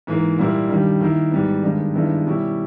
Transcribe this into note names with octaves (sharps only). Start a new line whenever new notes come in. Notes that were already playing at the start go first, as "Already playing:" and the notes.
G#2 E3 A#3
A#2 G3 A#3 E4
G2 D#3 G3
D#3 A#3 E4
G#2 G3 B3
G2 D#3 G#3 B3
G2 D#3 G#3 B3 E4
B2 G3 C#4 E4